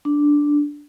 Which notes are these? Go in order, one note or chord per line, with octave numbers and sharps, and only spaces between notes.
D4